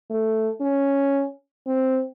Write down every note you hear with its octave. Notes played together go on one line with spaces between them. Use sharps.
A3
C#4
C4